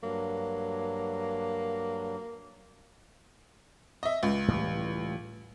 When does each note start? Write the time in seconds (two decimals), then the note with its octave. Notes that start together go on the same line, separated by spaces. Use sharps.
0.03 G2 F#3 A#3
4.03 D#5 E5
4.23 C#2
4.48 A2 E3 G3